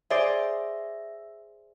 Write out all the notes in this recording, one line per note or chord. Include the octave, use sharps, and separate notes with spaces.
G#4 C5 D5 E5